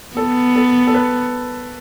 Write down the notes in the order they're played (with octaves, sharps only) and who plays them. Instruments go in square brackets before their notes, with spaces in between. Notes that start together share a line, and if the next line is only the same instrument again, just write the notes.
[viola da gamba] B3 [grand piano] A4
[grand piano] A4
A4
B4